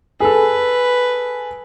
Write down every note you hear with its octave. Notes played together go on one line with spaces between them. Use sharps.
G#4 A4 B4